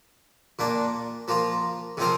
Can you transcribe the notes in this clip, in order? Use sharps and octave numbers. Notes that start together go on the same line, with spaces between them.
A#2 A#3 D4
F3 A#3 F4
C3 F3 C4 F4 A#4